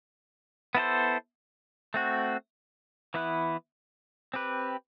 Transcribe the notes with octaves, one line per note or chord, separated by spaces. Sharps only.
B3 E4 A4 C5
A3 C4 F#4
E3 B3 E4 B4
C4 G4 B4